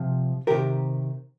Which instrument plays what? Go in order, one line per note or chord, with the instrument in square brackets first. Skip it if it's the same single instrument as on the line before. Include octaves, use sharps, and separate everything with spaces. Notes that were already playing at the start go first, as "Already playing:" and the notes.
Already playing: [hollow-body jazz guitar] C3 F3
C3 D#3 G4 A#4